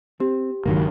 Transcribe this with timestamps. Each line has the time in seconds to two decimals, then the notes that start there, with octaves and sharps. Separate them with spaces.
0.20 C4 G4
0.66 G1 C#2 D#3 F#3 A#3